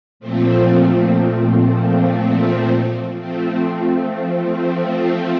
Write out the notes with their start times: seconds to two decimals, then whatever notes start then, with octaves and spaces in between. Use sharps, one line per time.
0.20 A#2 F3 A3 C4
3.19 F3 A3 C4